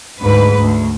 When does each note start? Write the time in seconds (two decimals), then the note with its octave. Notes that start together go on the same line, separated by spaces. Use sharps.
0.23 D2 G#2 B4
0.58 D2